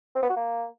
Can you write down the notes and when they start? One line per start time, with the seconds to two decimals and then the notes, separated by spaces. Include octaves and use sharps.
0.15 C4
0.22 B3
0.29 F#4
0.36 A#3